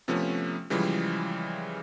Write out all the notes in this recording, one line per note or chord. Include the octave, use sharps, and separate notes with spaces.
C3 F3 A3 B3 C#4
C#3 E3 F3 G3 G#3